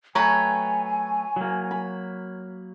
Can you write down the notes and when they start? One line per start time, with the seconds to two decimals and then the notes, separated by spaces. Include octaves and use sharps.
0.15 F#3 A3 B4 C#5 G5 G#5 A#5
1.36 F#3 A#3
1.71 B5